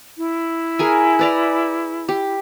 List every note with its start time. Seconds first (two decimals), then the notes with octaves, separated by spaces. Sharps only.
0.18 E4
0.79 G#4 A#4 G#5
1.19 B4 D5 A#5
2.09 G4